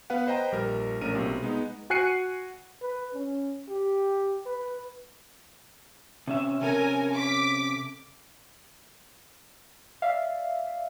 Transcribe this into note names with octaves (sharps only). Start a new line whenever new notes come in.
B3 B4 F5 F#5
B4 C5 D#5 G5 A#5
A#1 G3 A#4
A#1 A3 C#4 A#4 D#7
B1 C3
G#3 B3 D#4
F#4 G#5 F#6 C7 C#7 D#7
B4
C#4
G4
B4
C3 C#4 E5
C3 C#4 A4 A#4 G#5
D6 B6
D5 E5 F5